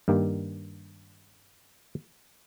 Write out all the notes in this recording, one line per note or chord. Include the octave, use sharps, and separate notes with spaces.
G2 D#3 A#3 G4